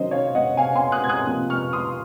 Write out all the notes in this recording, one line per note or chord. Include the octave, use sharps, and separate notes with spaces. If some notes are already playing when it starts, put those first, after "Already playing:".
Already playing: D#3 F#3 C#4 C5 D#5
C#5 F5
D#5 F#5
F5 G#5
G#5 C6
D#6 F#6
G#6
D#6 F#6
C3 F3 A#3
C#6 F6
C6 D#6